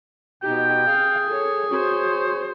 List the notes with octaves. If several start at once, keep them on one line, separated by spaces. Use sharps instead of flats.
B2 D#4 G4 G5
G#4 F5
A4 C#5
F#4 C5 C#5